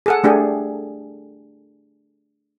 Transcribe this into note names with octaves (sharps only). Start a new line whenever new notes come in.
G#4 A4 F#5
A3 D4 G4 G#4